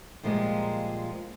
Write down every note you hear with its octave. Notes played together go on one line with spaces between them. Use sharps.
A#2 F3 G3 G#3 A#3